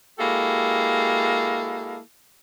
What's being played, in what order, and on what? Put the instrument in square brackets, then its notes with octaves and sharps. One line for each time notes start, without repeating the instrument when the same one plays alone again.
[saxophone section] G#3 A#3 E4 F#4 G4 A4